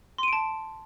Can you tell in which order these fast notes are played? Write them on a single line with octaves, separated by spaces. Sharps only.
C6 D#7 D7 A5